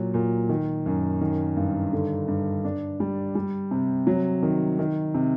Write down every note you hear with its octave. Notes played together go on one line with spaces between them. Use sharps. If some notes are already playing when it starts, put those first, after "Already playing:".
Already playing: A#2 F#3
A#2
D#3
F#2
D#3
G2
D3
G2
D4
G3
G3
C3
F#3
D#3
D#3
C3